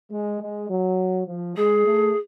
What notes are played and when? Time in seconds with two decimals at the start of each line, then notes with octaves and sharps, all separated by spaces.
0.11 G#3
0.40 G#3
0.70 F#3
1.27 F3
1.56 G#3 G#4
1.85 A3